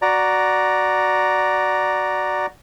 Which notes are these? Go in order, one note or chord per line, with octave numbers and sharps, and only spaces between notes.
F#4 D5 A#5